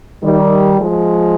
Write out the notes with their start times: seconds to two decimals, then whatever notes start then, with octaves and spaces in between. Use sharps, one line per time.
0.23 D#3 G3
0.79 F3 G#3